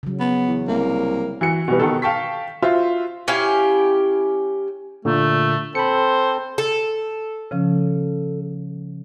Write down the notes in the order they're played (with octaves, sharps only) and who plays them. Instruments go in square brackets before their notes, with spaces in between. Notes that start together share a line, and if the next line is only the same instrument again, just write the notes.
[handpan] C#3 F#3
[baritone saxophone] B3
[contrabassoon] E2
[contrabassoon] C2 [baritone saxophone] A#3
[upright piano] E3 F#4 C#7
B2 E3 G3 B4
B2 D#3 A4
F5 G5 A5 C#6 B6
F4 F#4 C5 E5
[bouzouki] C#4 E4 G4 F5
[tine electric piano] A#2 D3 [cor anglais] A3
[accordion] C4 A4 [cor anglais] C5 [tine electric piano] B5 C#7
[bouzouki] A4
[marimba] C#3 F3 C#4